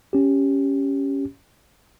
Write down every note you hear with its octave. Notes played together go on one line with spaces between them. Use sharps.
C#4 G4